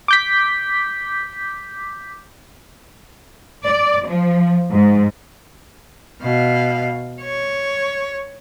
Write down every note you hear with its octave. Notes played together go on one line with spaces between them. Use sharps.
D6 G6 B6
D5
F3
G#2
B2 F5
C#5